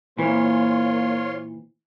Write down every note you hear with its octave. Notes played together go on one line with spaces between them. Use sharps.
A#2 E3 A#3 F4 C5 C#5 C6